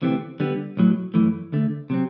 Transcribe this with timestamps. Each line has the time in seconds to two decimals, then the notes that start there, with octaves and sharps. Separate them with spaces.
0.02 D2 C3 E3 A3 C4
0.40 D3 G3 B3
0.77 B1 A2 F#3
1.14 F#2 E3 A3
1.52 D2 D3 A3
1.90 C3 F#3 C4